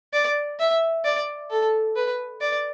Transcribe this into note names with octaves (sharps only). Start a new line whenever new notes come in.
D5
E5
D5
A4
B4
D5